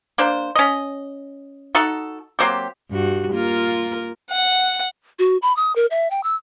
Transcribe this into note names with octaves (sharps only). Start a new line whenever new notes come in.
A#3 D4 C5
C#4 D#5
D#4 F#4 A4
F#3 A#3 C4 G4
G2 F#4
A#3 F4 A#4
F#5
F#4
B5
D#6
A#4
E5
G5
E6